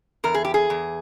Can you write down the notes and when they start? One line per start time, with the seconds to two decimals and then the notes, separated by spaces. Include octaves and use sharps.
0.24 E2 A#4
0.34 G#4
0.45 G4
0.54 G#4
0.70 E2